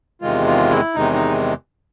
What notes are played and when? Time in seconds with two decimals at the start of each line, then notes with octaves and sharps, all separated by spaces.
0.21 E2 C3 D#3 G#3 F4
0.47 F4
0.70 E4
0.95 E2 C3 D#3 G#3 D#4
1.14 D#4